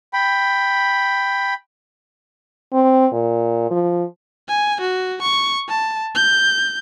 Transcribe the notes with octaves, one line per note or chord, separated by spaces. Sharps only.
G5 B5
C4
A#2
F3
G#5
F#4
C#6
A5
G6